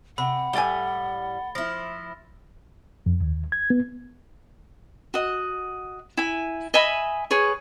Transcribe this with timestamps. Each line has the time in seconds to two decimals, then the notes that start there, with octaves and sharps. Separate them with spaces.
0.18 C3 F#5 B5
0.53 A2 G3 A3 G4 G#5 A6 G7
1.55 F3 E4 A#6
3.06 F2
3.21 D#2
3.52 G#6
3.70 B3
5.14 F#4 D#5
6.17 E4 G#5
6.74 D#5 E5 G#5 B5
7.31 G#4 B4 C#5